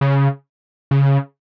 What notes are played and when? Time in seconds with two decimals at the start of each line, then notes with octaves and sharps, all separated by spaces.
0.01 C#3
0.91 C#3